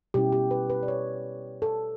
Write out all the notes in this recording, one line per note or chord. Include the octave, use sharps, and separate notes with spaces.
B2 G3 C#4 E4 G4
G4
B4
B4
D5
C#5
A4